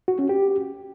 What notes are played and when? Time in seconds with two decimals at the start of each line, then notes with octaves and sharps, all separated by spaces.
0.08 F#4
0.19 C#4
0.29 G4